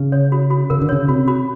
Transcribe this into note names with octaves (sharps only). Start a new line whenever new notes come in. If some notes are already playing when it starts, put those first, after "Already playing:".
Already playing: C#3
C#5
F#4
F#4
C#3 A#4
D3
C#3 C#5
C3 F#4
F#4